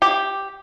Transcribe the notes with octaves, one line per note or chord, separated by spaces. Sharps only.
G4